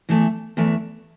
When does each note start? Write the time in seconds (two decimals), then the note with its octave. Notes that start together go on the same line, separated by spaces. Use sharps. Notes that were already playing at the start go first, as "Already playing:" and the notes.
0.09 E2 E3 A3
0.57 E2 E3 A3